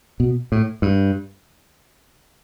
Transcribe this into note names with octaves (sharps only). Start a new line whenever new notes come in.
B2
A2
G2